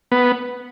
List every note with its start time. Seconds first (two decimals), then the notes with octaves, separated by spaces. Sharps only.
0.12 B3